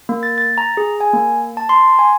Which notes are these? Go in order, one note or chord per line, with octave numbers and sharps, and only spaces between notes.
A#3
A6
A6
A#5
G#4
G#5
A#3
A5
C6
G#5